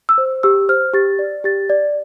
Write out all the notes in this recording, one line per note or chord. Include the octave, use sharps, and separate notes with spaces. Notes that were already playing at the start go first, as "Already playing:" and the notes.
E6
C5
G4 E6
C5 F6
G4 A6
D5
G4 A6
D5